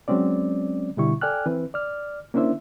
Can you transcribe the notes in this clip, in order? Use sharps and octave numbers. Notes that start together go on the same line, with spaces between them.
F#3 G#3 C4 C#4 D5
B2 D3 G3 E4 C#6
A4 D5 G5 G#5 F6 F#6
E3 C4 B4
D5 F6
A#3 C#4 D4 E4 C5 E5